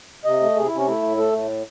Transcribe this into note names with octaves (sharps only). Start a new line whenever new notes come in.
C3 D#5
A3
C3 G#4
C3 E4
C#4
A3 E4
A2
A3 A4
A2